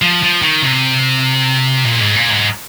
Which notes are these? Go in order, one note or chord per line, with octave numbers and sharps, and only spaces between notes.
F3
F3
D#3
C3
A#2
G#2
A#2
G#2